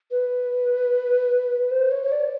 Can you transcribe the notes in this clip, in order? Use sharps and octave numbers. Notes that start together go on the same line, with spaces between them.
B4
C5
C#5
C#5
D5